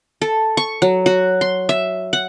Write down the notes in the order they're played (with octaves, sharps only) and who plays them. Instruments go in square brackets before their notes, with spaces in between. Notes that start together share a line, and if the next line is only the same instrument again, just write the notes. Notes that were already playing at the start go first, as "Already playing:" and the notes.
[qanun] A4
C#6
F#3
F#4
C6
E5
F#5